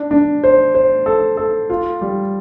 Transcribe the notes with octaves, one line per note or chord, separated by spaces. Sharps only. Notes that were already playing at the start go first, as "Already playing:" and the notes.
Already playing: D4
D4
C5
C5
A4
A4
F4
G3